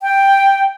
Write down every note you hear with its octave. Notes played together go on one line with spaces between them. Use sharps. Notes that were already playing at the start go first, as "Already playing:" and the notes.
G5